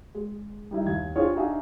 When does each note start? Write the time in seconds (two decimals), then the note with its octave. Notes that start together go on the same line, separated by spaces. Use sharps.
0.14 G#3
0.71 G3 D#4 E4
0.86 D#2 G#6
1.16 D4 F4 G4 G#4 C5 C#5
1.36 D4 D#4 F#4 E5 F5 G#5